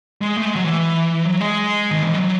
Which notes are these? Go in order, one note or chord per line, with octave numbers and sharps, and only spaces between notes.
G#3
A3
G#3
F#3
E3
F#3
G#3
D#3
E3
F#3